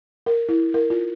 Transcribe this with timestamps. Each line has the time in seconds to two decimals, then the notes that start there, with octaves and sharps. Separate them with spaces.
0.26 A#4
0.49 E4
0.74 A#4
0.90 F4